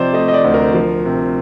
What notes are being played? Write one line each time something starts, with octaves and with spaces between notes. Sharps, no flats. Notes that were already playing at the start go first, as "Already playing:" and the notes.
Already playing: C3 F3 C5 D5 D#5
A3 D#5
D#5
D5
D2
A#4
F3
C3